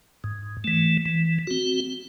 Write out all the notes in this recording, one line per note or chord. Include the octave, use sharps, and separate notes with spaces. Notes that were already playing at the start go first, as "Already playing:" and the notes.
G#2
E3 A3
E3
C4 F#4